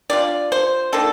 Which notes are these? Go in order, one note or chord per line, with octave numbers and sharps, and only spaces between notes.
G3 D4 F4 D5
C5
D#3 A#3 D4 F4 A4